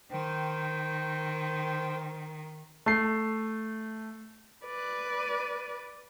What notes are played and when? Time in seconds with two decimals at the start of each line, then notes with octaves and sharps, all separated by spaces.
0.12 D#3 C5 G5
2.86 A3 C7
4.65 B4 D5